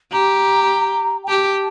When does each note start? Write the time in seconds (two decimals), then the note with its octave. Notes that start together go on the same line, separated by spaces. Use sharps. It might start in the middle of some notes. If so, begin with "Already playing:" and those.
0.12 G4 A#5
1.23 G5
1.27 G4 A5